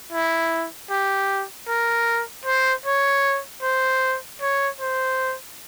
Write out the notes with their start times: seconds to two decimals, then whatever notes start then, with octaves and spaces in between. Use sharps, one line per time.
0.12 E4
0.91 G4
1.68 A#4
2.46 C5
2.86 C#5
3.63 C5
4.42 C#5
4.81 C5